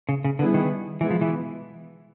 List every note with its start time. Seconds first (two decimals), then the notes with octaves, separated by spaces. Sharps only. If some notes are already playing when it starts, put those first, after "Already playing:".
0.09 C#3
0.24 C#3
0.39 D3 G3 B3 E4 G#4 B4
0.54 D#3
1.01 B2 E3 G#3 B3 E4
1.11 F3
1.21 E3